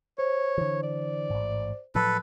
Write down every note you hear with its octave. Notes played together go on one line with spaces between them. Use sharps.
C5 C#5
D3 E3
D5
A1 G#2
A2 F3 F#3 A4 B4